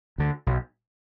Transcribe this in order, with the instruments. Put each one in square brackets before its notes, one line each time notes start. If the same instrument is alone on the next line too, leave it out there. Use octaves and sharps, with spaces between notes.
[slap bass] D2 D3
B1